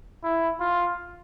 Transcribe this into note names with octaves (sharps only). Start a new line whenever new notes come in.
E4
F4